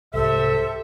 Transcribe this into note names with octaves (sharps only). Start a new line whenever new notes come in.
C2 G#2 G4 A4 C5 E5